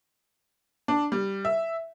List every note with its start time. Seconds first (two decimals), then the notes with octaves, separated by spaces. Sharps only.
0.88 D4
1.12 G3
1.45 E5